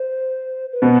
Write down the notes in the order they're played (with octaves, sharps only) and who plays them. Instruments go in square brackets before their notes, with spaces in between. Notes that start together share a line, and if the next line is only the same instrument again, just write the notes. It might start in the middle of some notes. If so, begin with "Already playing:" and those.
Already playing: [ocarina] C5
B4
[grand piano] B2 B3 [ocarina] C5